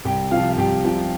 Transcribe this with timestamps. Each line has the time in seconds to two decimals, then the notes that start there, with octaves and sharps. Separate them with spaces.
0.05 C2 G4 G5
0.31 C3 F4 F5
0.36 F3
0.50 F5
0.57 C2 G4 G5
0.84 C3 F3 G4 G5